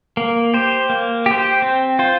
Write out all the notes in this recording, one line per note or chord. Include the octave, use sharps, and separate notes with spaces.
A#3
G4 C5
A#3
G4 C5
C4
F4 C5